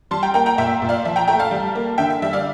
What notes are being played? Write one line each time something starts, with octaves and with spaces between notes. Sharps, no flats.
G3 A5 C6
G5 A#5
A#3 G5 A#5
G5 A#5
A#2 E5 G5
A#2
D5 F5
F3 E5
G5 A#5
A3 G5 A#5
F5 A5
G3
A#3
D3 E5 G5
E5
G3 E5
D5 F5